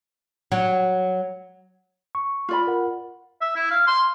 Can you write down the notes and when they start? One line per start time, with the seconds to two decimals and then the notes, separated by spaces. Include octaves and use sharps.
0.52 F#3
2.15 C#6
2.49 F4 D5 B5
2.67 A#4 F#5
3.41 E5
3.56 E4
3.71 F5
3.87 C6